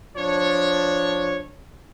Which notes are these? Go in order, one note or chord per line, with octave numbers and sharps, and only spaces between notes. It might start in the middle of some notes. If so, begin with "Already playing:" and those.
F3 D4 C#5